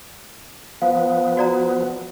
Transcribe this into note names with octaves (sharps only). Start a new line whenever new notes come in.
F3 B3 F5
F#4 D5 A#5